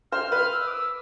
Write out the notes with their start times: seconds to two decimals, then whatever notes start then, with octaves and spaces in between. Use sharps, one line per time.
0.12 C5 F6
0.32 B4 F6
0.53 E6
0.67 D6
0.71 E6